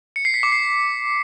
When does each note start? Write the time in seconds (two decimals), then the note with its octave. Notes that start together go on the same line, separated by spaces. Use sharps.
0.16 C#7
0.25 C7
0.34 B6
0.43 D6
0.52 C7